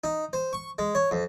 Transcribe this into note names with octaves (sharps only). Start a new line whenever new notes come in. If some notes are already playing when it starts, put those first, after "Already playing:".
D#4
C5
C#6
G#3
C#5
F2